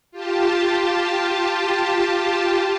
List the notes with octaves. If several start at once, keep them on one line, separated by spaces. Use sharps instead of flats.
F4 G4 A5